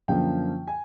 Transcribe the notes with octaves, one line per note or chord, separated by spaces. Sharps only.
F#2 D3 F3 A#3 G5
G#5